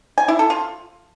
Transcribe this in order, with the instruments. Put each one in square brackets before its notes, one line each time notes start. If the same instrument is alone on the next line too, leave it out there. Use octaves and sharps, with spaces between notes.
[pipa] G#5
E4
A4
F4